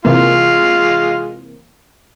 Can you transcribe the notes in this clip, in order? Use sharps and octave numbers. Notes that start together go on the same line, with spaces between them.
C3 E3 G#3 A#3 F4